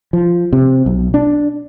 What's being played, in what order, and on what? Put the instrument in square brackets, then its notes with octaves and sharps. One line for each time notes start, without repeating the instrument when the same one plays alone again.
[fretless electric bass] F3
C3
B1
D4